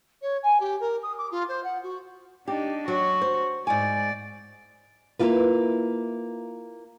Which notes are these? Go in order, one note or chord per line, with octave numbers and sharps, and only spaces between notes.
C#5
G#5
G4
A#4
D#6
D6
F4
C5
F#5
F#4
D4 D#4 G4
F#3 F#4
C5
G#2 D5 G#5
A#3 E4 F4 B4